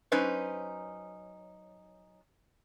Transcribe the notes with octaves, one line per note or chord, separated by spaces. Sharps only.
F#3 C#4 D#4 B4 C5